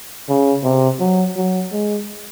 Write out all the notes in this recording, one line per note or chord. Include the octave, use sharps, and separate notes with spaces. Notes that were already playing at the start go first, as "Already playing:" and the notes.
C#3
C3
F#3
F#3
G#3